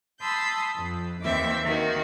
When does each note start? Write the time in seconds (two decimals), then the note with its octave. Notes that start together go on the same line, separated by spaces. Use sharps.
0.21 A5 B5 C6 D#6 E6 G6
0.76 F2
1.22 D#2 D#3 E3 C4 E5 D6
1.64 D#3 A#3 F#4